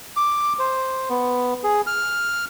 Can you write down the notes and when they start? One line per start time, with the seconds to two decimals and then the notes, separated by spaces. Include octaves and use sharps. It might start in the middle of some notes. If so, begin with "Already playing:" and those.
0.16 D6
0.59 C5
1.10 B3
1.64 G#4
1.87 F6